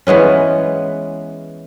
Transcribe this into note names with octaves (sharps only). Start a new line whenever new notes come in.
E3 G#3 B3 C#4